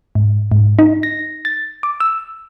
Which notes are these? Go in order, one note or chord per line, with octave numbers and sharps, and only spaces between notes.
G#2
G#2
D#4
A#6
A6
D6
E6